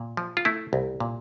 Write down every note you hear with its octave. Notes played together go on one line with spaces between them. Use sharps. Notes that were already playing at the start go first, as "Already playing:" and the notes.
Already playing: A#2
F3
F4
A3 E4
C2
A#2